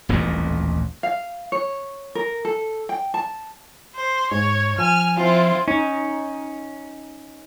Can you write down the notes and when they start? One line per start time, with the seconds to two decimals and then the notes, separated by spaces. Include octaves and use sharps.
0.09 D#1 A1 F2 A#2
1.03 F5
1.52 C#5
2.15 A#4
2.45 A4
2.89 G5
3.14 A5
3.95 C5
4.31 G#2 C#5
4.78 F3 G#5 F6
5.17 F3 C4 E4 F4
5.68 C#4 D#4